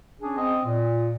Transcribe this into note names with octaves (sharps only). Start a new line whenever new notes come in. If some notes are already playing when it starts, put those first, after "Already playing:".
C#4 D4 G#4
C4 D#5
A#2